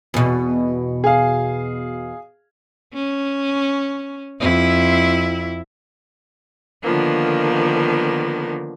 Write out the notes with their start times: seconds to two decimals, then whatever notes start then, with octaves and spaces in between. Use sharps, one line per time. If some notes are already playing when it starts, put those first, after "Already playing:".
0.14 E2 B2
1.04 G#4 F5
2.94 C#4
4.40 F2 E4
6.83 D3 D#3 F3 A#3 B3